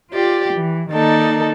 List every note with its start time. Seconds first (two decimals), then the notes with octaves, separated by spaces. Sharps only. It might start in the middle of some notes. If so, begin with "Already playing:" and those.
0.13 F4 G4 D5
0.55 E3
0.91 D#3 A#3 D#4 A4 D5